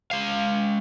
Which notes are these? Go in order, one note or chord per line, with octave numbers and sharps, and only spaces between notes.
G#3 F5